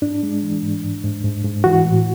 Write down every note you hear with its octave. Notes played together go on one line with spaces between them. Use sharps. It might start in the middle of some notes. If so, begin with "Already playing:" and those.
G#2 D4
G#3
E3
G#2
G#2
G#2
G#2
G#2
E3 F#4
A2